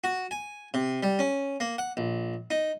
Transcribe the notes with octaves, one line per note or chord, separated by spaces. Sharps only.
F#4
G#5
C3
G3
C#4
A#3
F#5
A#1
D#4